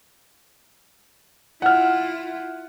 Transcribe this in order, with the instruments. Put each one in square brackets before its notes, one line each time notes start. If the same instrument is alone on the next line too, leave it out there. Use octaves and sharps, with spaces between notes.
[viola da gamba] E4 F4 [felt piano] F#5 F6